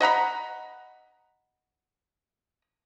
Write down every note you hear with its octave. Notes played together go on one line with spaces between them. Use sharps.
D#5 F#5 A#5 B5